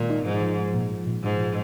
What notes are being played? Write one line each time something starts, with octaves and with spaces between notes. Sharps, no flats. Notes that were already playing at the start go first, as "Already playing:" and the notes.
Already playing: A#2 D#3 G#3 A#4
D#4
G#2 F3
F3
F3
A#2
F3
A#2
G#2 F3
F3